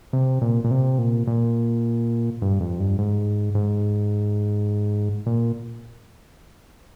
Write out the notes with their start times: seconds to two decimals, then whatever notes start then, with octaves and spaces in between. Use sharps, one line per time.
0.13 C3
0.42 A#2
0.64 A#2
0.71 C3
0.98 A#2
1.27 A#2
2.42 G2
2.60 F2
2.80 G2
2.98 G#2
3.55 G#2
5.26 A#2